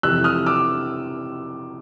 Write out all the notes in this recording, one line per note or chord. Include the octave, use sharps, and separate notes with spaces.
F2 C3 E3 E6 F#6
D#6 F6
D6 E6